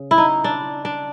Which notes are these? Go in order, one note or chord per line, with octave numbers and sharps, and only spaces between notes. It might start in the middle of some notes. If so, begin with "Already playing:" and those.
Already playing: C#3
E4
D#4
D4
D4